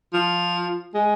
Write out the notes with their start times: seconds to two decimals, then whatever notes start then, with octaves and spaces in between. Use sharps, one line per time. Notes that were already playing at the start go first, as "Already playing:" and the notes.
0.13 F3
0.95 G#3